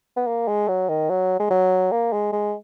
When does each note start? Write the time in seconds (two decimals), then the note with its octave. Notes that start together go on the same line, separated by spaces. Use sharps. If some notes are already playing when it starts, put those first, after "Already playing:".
0.16 B3
0.27 A#3
0.47 G#3
0.68 F#3
0.89 D#3
1.09 F#3
1.39 G#3
1.50 F#3
1.91 A#3
2.13 G#3
2.32 G#3